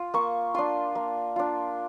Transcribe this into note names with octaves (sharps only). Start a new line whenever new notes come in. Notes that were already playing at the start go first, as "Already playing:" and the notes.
Already playing: F4
A#3 C#6
D4 F4 C6
A#3
D4 F4